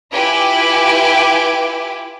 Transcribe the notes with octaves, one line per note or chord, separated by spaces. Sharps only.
E4 F4 G4 B4 G#5 D6